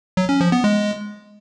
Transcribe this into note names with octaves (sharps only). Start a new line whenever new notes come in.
F#3
C#4
F3
B3
G#3